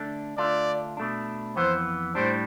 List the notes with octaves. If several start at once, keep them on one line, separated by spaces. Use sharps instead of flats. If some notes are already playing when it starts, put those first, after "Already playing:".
Already playing: D3 A3 D4
D3 A3 D4 F4 D5
B2 A3 D4
F2 E3 B3 C5
A2 G3 D4 C5